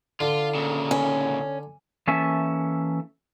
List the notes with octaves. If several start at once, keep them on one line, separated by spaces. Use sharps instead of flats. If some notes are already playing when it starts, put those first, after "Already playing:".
D3 F4
A#2 C#3
C#4
E3 A#3 C#4 A4 E5 A5